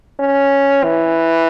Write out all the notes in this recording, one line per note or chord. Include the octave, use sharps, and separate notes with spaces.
C#4
E3